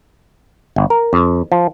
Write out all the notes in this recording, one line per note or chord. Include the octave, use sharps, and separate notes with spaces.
G1
A#4
F2
F3